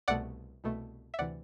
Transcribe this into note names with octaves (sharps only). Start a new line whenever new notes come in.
C2 B2 A3 D5 F#5
C2 B2 A3
E5
D2 C3 E3 D5 F#5